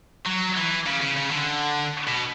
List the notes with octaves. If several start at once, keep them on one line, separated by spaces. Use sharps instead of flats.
F#3
E3
C#3
C#3
C#3
D3
B2